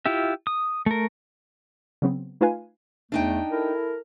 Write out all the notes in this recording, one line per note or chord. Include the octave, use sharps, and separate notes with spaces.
E4 F4 G4 E5
D#6
A3 A#4
C#3 F#3 B3 C4
A3 D#4 F4 B4 F5 G#5
E2 A3 D4 D#4 G5
E4 A4 A#4